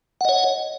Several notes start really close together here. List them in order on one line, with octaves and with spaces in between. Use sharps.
F#5 D#5 C#5